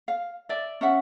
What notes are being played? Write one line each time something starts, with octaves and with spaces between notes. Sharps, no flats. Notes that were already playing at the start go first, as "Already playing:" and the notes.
F5
D5 E5
C#4 E5 F#5